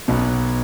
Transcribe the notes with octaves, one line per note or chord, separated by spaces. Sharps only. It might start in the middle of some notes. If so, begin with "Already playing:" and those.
B1 B2 B3